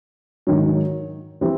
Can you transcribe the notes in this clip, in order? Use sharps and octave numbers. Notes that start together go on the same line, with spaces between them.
G#2 D#3 F#3
E3 G3 C4